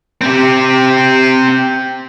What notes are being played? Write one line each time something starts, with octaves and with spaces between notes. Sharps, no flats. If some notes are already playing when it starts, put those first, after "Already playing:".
C4 G4